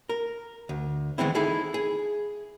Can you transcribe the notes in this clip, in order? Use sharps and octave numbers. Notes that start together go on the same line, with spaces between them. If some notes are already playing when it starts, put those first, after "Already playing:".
A#4
D2
D#3 E3 G#3 B3 C4 E4
D#4 E4 G#4 A4
G#4